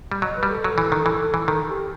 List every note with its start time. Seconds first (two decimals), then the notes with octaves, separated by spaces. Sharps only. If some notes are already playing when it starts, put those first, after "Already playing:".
0.12 G3
0.22 F#3 D#5
0.36 B4
0.43 G3
0.50 A4
0.64 F#3
0.78 E3
0.92 D#3
1.06 E3
1.34 E3
1.48 D#3 A4
1.69 G4